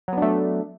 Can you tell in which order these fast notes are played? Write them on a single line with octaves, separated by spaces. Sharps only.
F#3 B3 D4 A3